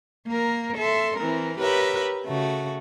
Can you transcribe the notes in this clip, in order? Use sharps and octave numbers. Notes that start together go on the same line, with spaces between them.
A#3 A#4
A4 E5 C6
E3 C4 A#4
G4 A#4 B4 C#5 E5
C#3 A3 F#4